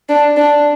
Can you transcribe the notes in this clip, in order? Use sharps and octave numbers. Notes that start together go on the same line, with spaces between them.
D4
D4